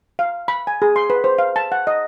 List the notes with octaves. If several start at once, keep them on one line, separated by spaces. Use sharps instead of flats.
F5
B5
G#5
G#4
C6
B4
C5
F5
A5
F#5
D#5